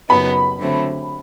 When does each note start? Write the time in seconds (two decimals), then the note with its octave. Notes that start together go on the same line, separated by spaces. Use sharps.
0.09 F#2 C#3 F#3 B3 D#4 B5
0.59 D3 F#3 A3 C4